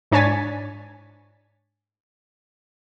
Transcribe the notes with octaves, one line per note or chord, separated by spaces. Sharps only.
G#2 D4 C#5 G#5 A6 B6